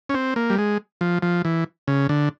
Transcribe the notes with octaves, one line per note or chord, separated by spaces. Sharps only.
C#4
C4
A#3
G3
G#3
F3
F3
E3
C#3
D3